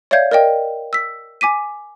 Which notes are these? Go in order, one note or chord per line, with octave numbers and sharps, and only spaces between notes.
C#5 D5 E5 F5 G6 G#6
A#4 D5 D#5 G5
E6 B6
G#5 D6 B6 D#7